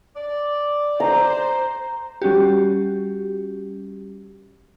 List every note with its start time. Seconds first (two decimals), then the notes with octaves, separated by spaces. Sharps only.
0.16 D5
1.00 C5 A#5
2.22 G3 C#4 F#4 G4